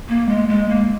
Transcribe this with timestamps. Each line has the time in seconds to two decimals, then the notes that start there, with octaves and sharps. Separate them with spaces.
0.09 A#3
0.29 G#3
0.48 G#3
0.69 A#3